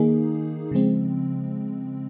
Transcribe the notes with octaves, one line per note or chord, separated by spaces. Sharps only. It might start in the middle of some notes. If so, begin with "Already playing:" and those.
Already playing: D#3 A#3 D#4 G#4
C#3 F3 G#3 C4